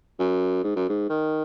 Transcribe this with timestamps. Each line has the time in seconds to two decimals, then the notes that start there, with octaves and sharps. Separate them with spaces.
0.19 F#2
0.64 G#2
0.76 F#2
0.89 G#2
1.09 D#3